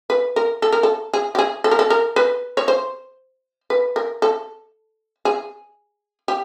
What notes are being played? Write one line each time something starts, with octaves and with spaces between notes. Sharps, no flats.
B4
A#4
A4
A#4
A4
G#4
G4
G#4
A4
A#4
A4
A#4
B4
C#5
C5
B4
A#4
A4
G#4
G4